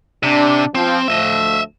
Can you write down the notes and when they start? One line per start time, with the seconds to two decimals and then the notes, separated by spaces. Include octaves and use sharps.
0.23 C3 D4
0.75 F3 C4
1.08 D2 F3 A3 D#5 E5